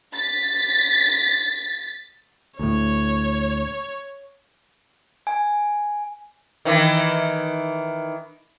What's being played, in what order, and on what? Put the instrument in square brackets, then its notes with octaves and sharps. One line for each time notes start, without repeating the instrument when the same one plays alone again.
[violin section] A6 B6
[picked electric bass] D2 A2 [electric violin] C#5
[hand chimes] G#5
[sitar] D#3 E3